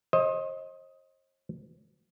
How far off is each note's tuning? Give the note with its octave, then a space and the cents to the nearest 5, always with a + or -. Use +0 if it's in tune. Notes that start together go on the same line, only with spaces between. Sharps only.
C5 +40 D#5 +10